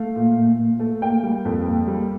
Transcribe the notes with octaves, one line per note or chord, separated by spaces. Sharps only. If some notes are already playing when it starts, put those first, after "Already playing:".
Already playing: A3 F5
A#2
A#2
A#2
A3
A#3 G5
G3
F2
A#3
G3